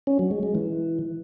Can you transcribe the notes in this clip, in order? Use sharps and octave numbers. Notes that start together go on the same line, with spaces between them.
C#4
F#3
G#3
G#3
E3